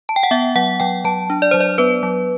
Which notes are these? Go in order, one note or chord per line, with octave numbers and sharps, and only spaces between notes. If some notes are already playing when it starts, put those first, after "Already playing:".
A5
G5
F#5
B3 E5
F#3 F#5
F#3 G5
F#3 A5
D4
D5
F#3 C5
D5
B3 B4
F#3